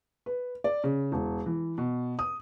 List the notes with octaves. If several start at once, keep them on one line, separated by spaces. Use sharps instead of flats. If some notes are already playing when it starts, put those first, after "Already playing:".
B4
D5
C#3
E1
E3
B2
D#6